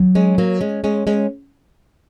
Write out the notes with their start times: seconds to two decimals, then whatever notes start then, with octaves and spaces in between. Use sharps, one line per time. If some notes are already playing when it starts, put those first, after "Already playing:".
Already playing: F#3
0.15 G#3 C#4
0.38 F#3 A#3
0.61 G#3 C#4
0.84 G#3 C#4
1.07 G#3 C#4